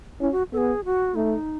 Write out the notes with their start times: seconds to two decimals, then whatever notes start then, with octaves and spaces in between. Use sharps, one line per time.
0.20 C#4 E4
0.32 F#4
0.53 B3 A4
0.57 G#4
0.85 F#4
1.15 A3 D#4